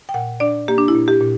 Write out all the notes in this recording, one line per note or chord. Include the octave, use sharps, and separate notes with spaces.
G5
A#2 F#5
D4 D5
A#3 G4
D4
E4
A#2
G4
A#2